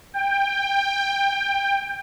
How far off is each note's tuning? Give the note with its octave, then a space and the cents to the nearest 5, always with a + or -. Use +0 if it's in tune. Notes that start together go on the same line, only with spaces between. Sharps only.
G5 +20